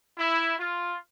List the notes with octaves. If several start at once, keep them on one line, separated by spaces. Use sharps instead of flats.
E4
F4